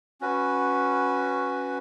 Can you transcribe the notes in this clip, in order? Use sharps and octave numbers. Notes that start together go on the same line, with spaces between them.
C#4 F#4 B4